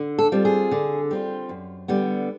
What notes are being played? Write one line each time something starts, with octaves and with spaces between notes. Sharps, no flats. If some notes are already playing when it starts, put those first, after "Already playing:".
Already playing: D3
A4
G3 C4 F4
G#4
D3
G3 C4 F4
F#2
D3 G3 B3